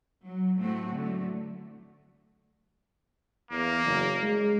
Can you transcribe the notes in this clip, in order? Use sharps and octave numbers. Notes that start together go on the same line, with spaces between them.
F#3
A2 A3 C4 F#4
D3 F#3 A3
E2 A#3
F#1
G#3